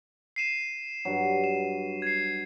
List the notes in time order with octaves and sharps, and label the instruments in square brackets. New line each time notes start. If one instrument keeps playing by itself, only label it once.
[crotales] C7 D#7 E7
[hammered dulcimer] G2 F#3
[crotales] E7
G#6 C7